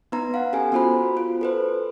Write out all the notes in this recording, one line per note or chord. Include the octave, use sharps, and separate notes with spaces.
B3 D#4 B4 A#5
F5 F#5
C#4 G4 A4 G#5
B3 F4 F#4 C5 B5
F4
A4 B4 C5